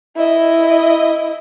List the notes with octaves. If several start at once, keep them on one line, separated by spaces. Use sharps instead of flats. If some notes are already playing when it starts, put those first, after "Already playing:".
E4 D#5